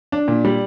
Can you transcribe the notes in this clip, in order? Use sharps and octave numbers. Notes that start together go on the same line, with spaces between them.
D4
A#2
G3